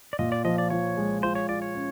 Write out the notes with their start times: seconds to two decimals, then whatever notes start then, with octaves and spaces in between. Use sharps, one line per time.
0.13 D5
0.19 A#2 D#5
0.32 D5
0.45 F3 D#5
0.58 D5
0.70 F3 C#5
0.97 G#3
1.23 F4 C5
1.35 C#5
1.49 F4 D5
1.62 C#5
1.75 C#4